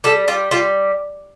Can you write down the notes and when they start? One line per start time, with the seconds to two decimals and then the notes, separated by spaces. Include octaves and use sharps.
0.04 G3 A4
0.28 G3 F4
0.51 G3 F4